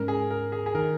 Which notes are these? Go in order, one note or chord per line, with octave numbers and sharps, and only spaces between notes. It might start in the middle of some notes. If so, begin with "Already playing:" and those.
Already playing: G#2 G#3 C#4 A#4
G#4
A#4
G#4
G#4
D#3 A#4